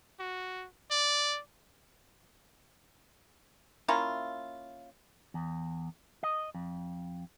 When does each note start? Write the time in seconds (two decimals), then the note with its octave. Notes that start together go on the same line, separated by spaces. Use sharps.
0.20 F#4
0.91 D5
3.88 A#3 C#4 E4 F4
5.34 E2
6.23 D#5
6.55 F2